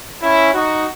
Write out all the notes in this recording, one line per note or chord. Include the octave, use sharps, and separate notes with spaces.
C#4 E4
D#4 F#4